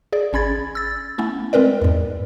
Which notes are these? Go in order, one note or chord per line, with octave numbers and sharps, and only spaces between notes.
G#4 D5
G#1 C#4 B5 G#6 A6
E6 A6
A3 B3 C#4 E4
G#3 C4 A#4 B4 D5
E2 G#2